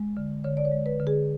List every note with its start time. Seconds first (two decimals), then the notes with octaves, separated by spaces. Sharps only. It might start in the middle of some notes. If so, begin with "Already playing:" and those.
Already playing: G#3
0.17 D3
0.44 D3 C#5
0.57 D5
0.65 C#5
0.72 G#3
0.86 B4
1.00 D3
1.07 G#4